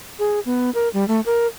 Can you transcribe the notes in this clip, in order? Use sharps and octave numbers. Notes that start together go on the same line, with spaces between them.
G#4
B3
A#4
G3
A3
A#4